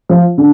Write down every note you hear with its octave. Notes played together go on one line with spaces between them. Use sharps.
F3
D3